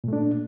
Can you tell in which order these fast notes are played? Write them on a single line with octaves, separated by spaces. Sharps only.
A#2 A3 D4